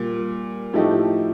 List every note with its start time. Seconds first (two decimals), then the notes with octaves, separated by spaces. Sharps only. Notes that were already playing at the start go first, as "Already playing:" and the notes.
Already playing: A#2 G3
0.73 A2 F3 A3 D#4 G4